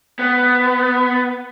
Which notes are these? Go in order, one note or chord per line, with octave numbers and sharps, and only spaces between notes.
B3